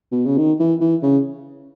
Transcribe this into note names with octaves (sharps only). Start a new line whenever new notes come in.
B2
C#3
D#3
E3
E3
C#3